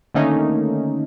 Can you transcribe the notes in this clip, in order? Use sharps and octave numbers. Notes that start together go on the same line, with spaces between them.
D3 D#3 A3 A#3 C#4 D#4